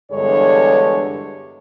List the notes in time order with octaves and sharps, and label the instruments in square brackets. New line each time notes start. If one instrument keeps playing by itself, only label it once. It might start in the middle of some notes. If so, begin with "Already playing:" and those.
[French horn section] E2 G2 D3 G#3 A4 C#5